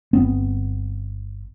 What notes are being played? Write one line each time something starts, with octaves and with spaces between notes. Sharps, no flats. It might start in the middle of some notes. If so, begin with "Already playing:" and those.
G1 B3 C4